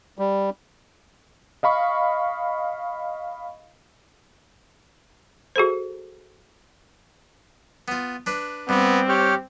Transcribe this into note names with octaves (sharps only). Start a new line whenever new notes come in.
G3
D#5 F5 B5 C#6
F#4 G#4 A4 C5
B3 F4
D4 B4
G2 B3 C4
G4 C5 C#5 F6